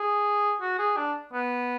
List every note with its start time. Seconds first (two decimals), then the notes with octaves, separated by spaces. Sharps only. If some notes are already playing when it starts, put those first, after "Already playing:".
Already playing: G#4
0.61 F#4
0.79 G#4
0.97 D4
1.34 B3